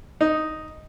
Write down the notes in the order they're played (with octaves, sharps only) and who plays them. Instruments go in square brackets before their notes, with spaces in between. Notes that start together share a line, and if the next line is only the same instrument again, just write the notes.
[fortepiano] D#4